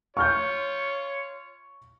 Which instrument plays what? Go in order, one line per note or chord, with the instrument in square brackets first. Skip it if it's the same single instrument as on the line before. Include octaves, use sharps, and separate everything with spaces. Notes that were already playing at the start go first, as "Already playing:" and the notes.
[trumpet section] F4 C#5 [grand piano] C#6 F6 G6